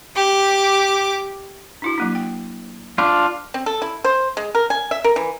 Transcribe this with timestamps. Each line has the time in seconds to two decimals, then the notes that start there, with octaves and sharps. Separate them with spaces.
0.16 G4 D6
1.82 D4 E4 F#4
1.98 F#3 A#3 D4
2.15 G5
2.98 D4 F4
3.54 C4
3.66 A4
3.82 E4
4.04 C5
4.37 G#3
4.55 A#4
4.70 G#5
4.91 E5
5.04 A#4
5.16 E3